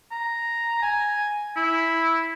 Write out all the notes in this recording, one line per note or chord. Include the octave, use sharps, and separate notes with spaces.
A#5
G#5
E4